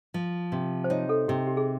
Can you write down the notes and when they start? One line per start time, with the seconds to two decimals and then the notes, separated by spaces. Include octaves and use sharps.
0.14 F3
0.52 C3
0.84 C5
0.90 D#4 C#5
1.09 A4
1.28 C3 G4
1.47 G4
1.57 G#4